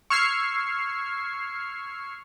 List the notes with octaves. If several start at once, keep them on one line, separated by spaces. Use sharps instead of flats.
C#6 E6 F6 G#6 C7